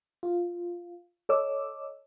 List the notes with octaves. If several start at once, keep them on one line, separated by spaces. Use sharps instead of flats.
F4
A4 C#5 D#5 D6 E6